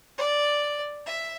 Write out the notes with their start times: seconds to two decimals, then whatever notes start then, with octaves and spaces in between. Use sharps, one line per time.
0.18 D5
1.06 E5